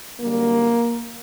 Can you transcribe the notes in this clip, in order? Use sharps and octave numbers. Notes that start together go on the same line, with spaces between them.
F#2 D3 G3 A#3